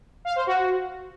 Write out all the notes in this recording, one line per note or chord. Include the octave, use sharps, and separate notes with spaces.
F5
C5
F#4